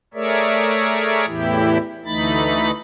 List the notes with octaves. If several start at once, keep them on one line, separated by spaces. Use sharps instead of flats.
A3 G#4 A#4 C#5 D5 E5
E2 A2 E3 E4 G4
D2 E3 A3 D#4 B5 A6